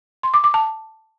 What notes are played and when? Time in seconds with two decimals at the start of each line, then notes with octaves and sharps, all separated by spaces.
0.23 C6
0.34 D6
0.44 D6
0.54 A5